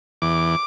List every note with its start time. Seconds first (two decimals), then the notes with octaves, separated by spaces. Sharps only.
0.22 E2 D6